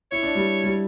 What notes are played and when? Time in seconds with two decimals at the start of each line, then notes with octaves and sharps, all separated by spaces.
0.11 E4 C#5
0.23 D4
0.35 G3
0.64 G3